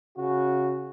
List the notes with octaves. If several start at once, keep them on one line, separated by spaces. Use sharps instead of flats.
C#3 F#4